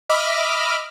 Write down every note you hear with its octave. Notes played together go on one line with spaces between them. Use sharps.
D#5 E5 B5 D6 F6